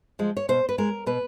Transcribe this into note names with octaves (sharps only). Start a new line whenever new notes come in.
F3 G#3
C#5
B2 C5
B4
G#3 A#4
B2 B4